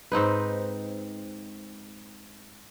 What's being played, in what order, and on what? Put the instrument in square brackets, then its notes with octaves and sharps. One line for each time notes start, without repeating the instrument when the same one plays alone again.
[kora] G#2 C4 D#4 B4